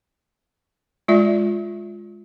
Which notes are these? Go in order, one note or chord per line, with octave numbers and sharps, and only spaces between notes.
G#3 F4 D5 E5